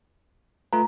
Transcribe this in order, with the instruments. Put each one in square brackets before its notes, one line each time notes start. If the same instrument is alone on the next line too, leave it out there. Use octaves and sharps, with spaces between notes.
[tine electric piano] A3 F4 B4 [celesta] A#5